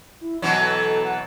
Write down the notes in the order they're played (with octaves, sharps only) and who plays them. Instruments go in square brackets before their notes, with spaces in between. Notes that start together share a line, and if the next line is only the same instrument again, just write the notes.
[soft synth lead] E4
[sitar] B2 E3 F#3 [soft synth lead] F#5
[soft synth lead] A4
F#5